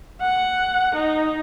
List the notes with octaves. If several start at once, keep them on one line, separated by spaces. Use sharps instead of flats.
F#5
D#4